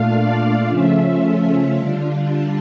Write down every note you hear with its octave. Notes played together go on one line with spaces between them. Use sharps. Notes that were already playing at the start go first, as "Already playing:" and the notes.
Already playing: A#2 A3 D4 F4 F5
D5
C#3 F3 A3 C#4 F4 E5
D3 G3 D4 F4
A5